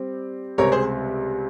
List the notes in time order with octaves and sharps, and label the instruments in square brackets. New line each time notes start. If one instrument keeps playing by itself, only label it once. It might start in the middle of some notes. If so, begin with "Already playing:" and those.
Already playing: [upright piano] G3 C4 G4
[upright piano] C#2 C3 G3 C4 [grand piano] A#4 C#5
[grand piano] G#4 C5